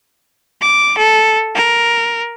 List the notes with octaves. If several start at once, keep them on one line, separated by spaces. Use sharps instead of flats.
D6
A4
A#4